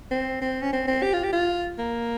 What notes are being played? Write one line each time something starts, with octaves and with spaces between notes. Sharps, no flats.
C4
C4
C#4
C4
C4
G4
F4
G4
F4
A#3